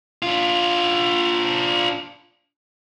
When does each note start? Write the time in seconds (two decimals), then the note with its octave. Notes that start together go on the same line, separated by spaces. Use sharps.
0.22 D4 F4